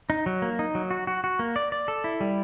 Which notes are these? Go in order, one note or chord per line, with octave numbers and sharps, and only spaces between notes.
D#4
F#3
A#3
D#4
F#3
F#4
F#4
F#4
A#3
D5
D5
A4
E4
G3